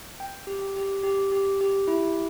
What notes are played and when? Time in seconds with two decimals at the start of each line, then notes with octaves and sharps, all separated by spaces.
0.20 G5
0.47 G4
0.76 G4
1.03 G4
1.32 G4
1.61 G4
1.88 E4